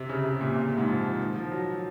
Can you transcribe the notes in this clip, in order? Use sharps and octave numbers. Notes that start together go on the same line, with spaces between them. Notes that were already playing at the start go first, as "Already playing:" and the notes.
Already playing: C3
C#3
C3
A#2
C3
A#2
G#2
F3
F3
D#3
F3
F#3